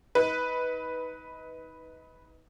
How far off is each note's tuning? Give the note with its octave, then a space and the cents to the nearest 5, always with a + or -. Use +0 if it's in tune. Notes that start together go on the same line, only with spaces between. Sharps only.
D#4 +30 B4 +0